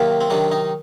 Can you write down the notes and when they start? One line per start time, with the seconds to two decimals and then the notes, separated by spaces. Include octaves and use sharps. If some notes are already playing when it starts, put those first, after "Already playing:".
Already playing: C3 D#3 F#3 A#3
0.21 C4
0.30 C3 D#3 F#3 D4
0.52 D#4